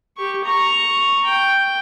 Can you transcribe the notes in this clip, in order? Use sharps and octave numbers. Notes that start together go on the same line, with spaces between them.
G4 C#6
A#5 C#6
G5